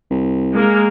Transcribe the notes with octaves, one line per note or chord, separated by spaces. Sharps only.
C2
G#3 A#3 A#4